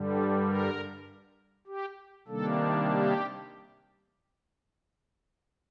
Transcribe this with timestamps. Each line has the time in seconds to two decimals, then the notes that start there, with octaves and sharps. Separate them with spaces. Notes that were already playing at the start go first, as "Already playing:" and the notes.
Already playing: G2 D3 G3
0.15 A4
0.44 A#4
1.67 G4
2.27 C3 D#3 G3 A#3 D4 A4
2.89 G4